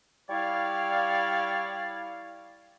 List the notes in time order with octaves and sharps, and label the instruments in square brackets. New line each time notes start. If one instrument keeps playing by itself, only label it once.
[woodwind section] G3 E4 C#5 D5 F5